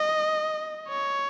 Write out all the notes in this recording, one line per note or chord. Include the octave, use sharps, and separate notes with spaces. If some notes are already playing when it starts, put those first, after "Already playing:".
Already playing: D#5
C#5